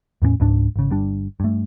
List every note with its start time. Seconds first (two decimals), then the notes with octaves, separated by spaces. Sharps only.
0.22 E2 A2 A#3 C#4
0.40 C#2 G#2 D4
0.76 G#1 C#3
0.90 G1 G3 D4
1.40 G2 A3